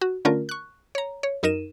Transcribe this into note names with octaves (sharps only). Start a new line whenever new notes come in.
F#4
D3 A3 C#4 F4 A#4
C#6 F#6
C#5 A#5
C#5
F#2 D#4 A#4 D#7 E7